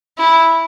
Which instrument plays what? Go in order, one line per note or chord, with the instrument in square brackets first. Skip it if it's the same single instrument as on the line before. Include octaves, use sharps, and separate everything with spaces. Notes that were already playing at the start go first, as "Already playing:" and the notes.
[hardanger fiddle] E4